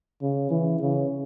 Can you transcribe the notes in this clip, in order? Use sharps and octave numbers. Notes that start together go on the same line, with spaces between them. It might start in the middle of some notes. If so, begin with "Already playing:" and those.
C#3
E3
C#3